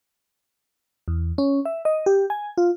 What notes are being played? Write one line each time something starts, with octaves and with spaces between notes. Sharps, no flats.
E2
C#4
E5
D#5
G4
G#5
F4